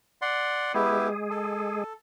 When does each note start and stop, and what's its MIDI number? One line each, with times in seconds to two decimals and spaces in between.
0.22 0.72 74
0.22 0.72 78
0.22 0.72 84
0.74 1.84 56
0.74 1.08 59
0.74 1.08 64
0.74 1.08 67
0.74 1.84 68
1.31 1.93 69